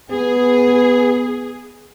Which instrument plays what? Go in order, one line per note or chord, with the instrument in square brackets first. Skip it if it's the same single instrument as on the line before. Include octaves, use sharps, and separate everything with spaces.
[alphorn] B3 [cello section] G#4